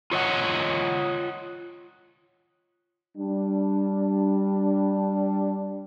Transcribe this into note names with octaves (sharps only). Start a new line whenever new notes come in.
F4 C#5 D#5 F#5
G3 D4